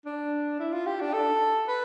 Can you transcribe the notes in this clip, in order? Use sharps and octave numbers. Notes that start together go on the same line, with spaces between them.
D4
E4
F4
G4
D4
A4
B4